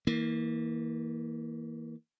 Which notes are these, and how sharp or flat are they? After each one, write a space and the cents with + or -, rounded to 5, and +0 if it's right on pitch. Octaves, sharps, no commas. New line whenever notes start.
E3 -30 A#3 +0